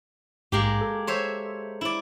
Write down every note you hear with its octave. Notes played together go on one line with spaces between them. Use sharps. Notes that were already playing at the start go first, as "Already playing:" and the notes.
A#1 G#2 G#3 A#3 G4
A4
C5 C#5 E5
E4 D5